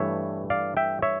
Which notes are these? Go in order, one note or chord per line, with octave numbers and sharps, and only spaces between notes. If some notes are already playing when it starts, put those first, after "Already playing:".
Already playing: G2 E3 A3 C#5 E5
D5 F5
E5 G5
C#5 E5